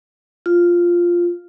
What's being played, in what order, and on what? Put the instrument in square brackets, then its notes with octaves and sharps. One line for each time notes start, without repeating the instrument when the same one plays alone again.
[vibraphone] F4